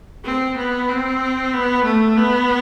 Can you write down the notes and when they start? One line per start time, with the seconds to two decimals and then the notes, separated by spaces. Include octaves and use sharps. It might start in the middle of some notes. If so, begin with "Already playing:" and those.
0.24 C4
0.57 B3
0.89 C4
1.54 B3
1.85 A3
2.17 B3